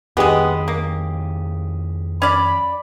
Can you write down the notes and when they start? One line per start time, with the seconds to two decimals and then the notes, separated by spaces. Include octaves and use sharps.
0.17 F2 D#3 G#3 B3 G4 G#4 D#5
0.68 A#3
2.22 C#4 D5 B5